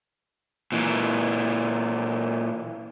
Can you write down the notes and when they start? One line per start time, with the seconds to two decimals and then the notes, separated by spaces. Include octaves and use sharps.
0.72 A#2 E3